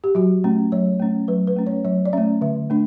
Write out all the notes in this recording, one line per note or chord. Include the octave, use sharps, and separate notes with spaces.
G4
F#3 F#4
A3 C#4
F#3 C#5
A3 C#4
F#3 B4
B4
A3 C#4
C#5
F#3 C#5
D5
A3 C#4 E5
D3 E5
A3 D4